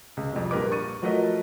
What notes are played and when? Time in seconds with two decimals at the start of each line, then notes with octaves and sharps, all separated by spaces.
0.17 C#2
0.32 C2 F2
0.51 A#1 G2 A#4 B4 D6
0.72 C#6 A6 D#7
1.02 F3 F#3 A3 A#4 B4 D#5